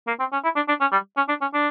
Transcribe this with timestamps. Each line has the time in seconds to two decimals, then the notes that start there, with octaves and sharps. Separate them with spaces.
0.07 A#3
0.19 C4
0.33 C#4
0.44 E4
0.56 D4
0.68 D4
0.81 C#4
0.92 G3
1.17 C#4
1.29 D4
1.41 C#4
1.54 D4